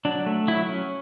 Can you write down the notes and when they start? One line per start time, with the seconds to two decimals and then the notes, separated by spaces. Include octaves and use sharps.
0.05 F#3 D4
0.26 A3
0.48 F#3 E4
0.69 C#4